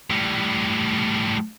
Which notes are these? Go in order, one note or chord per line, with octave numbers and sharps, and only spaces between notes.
A2 G3